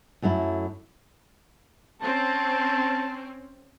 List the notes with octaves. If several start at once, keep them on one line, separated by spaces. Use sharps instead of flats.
F#2 F#3 A3 E4
C4 C#4 A5